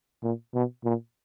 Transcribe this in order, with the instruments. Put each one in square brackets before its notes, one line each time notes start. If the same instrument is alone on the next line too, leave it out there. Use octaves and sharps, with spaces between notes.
[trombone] A#2
B2
A#2